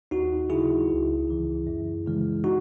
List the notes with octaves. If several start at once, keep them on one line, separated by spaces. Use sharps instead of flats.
D#2 D#4 F#4
C#3 F#3 E4 G#4
C#2
C#3 E3
F#2
C#3 E3 G#3
D#4 F#4